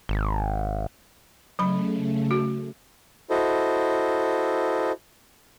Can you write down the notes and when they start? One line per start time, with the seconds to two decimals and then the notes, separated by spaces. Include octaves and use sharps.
0.09 G#1
1.59 C#3 F#3 A3 B5
2.31 F#4
3.30 E4 F#4 A4 C5 D#5